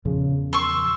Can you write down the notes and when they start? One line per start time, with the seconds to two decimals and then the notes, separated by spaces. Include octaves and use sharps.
0.05 E2 A#2 C#3 F3
0.53 C6 C#6 E6